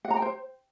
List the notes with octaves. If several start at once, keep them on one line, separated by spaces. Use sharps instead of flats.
F#5
A#5
G5
C5